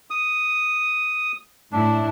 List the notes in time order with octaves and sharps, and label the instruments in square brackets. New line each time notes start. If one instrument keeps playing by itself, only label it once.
[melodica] D#6
[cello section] A2 E4 [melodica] D4